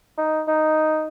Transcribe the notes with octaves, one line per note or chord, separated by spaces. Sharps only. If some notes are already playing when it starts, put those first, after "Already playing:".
D#4
D#4